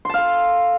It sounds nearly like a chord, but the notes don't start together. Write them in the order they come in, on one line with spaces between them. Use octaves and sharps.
C6 A5 F5 A4